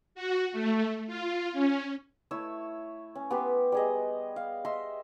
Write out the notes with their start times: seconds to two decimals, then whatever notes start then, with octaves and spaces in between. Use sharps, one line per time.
0.15 F#4
0.52 A3
1.07 F4
1.52 C#4
2.31 A3 E4 C#5 E6
3.15 C#4
3.31 B3 G4 C6
3.72 G3 G#4 D#5
4.36 F5
4.65 D#5 E5 C6